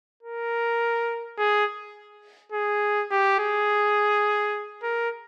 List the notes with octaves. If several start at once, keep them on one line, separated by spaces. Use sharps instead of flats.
A#4
G#4
G#4
G4
G#4
A#4